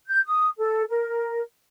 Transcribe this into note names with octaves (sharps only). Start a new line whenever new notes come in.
G6
D#6
A4
A#4